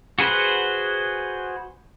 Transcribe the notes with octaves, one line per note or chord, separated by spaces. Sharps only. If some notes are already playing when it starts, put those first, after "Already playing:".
F#4 G#4 B4 C5 F#5